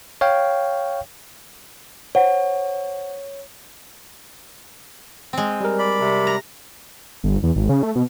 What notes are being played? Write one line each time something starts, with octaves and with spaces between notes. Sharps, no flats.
C#5 F5 G5
C5 C#5 F#5
G#3 C4
G3 A#4
D5 B5
C3
A#5
G1
E2
G#1
C#3
A3
B2